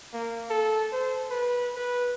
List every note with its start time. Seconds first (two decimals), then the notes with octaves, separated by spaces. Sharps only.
0.14 A#3
0.51 A4
0.93 C5
1.31 B4
1.76 B4